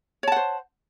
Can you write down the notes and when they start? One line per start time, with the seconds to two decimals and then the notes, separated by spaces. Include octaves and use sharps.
0.23 C#5
0.28 A5
0.32 F#5
0.36 C5